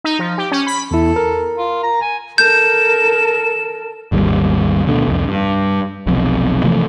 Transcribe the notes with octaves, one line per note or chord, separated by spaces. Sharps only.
D#4
F3
G4
C#4
B5
E2 E4 A4
A#4
F4
A#5
G#5
A4 A#4 G6 E7
G#1 D#2 C3 G3
D2 B2 D3
C2 F2
G2
F1 B1 F2
C3 E3 F3 A3